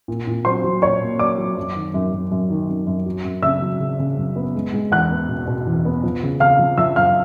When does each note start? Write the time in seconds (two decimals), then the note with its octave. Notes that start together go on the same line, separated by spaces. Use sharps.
0.08 A#2
0.27 A#2
0.45 F#3 C5 C6
0.64 F#3
0.82 A#2 C#5 C#6
1.01 A#3
1.19 F#3 D5 D6
1.38 F#3
1.57 F#2
1.76 D#3
1.94 F#2
2.13 F#2
2.32 F#2
2.50 D#3
2.69 F#2
2.87 F#2
3.06 F#3
3.24 F#2
3.43 C#3 E5 E6
3.62 F#3
3.80 C#3
3.99 C#3
4.18 F#2
4.36 B3
4.55 G#3
4.73 G#3
4.91 E2 F#5 F#6
5.11 B3
5.29 B2
5.48 B2
5.66 E2
5.85 B3
6.03 F3
6.23 C#3
6.40 C#3 F5 F6
6.59 F3
6.78 F3 E5 E6
6.96 F#2 F5 F6